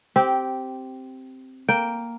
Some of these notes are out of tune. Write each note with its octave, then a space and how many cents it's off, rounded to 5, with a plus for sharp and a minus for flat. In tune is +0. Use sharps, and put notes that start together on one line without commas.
C4 +0 G4 -10
A#3 +0 G5 +0